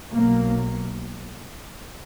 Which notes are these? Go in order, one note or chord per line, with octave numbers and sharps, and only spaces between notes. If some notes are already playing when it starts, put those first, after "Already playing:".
B1 B2 F#3 A#3